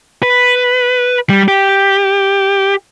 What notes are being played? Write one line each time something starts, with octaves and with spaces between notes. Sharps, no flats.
B4
G3
G4